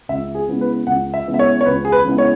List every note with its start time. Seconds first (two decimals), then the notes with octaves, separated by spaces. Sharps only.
0.09 C#2 E5
0.35 G#4
0.48 C#3 G#3 B3 E4
0.61 B4
0.87 C#2 F#5
1.14 E5
1.27 C#3 G#3 B3 E4
1.34 E5
1.39 C#5
1.61 C#5
1.66 C#2 B4
1.85 G#4
1.92 B4
2.05 C#3 G#3 B3 E4
2.18 C#5